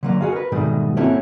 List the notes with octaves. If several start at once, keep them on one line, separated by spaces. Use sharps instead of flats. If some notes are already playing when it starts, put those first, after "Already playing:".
D3 F#3 A#3
F#4 G#4 F5
A#4 B4
G#2 B2 D#3 G3 A3
A#3 C4 C#4 E4 F#4 A4